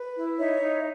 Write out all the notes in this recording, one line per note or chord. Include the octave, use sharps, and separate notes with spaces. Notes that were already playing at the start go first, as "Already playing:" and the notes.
Already playing: B4
E4
D#4 C#5 E5
D#4